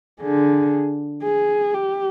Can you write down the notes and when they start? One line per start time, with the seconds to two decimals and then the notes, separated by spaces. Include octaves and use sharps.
0.21 D3 G#4
1.23 G#4
1.73 G4